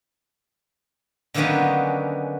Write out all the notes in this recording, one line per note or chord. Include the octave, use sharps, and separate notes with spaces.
D3 D#3 F#3 A#3 B3 C#4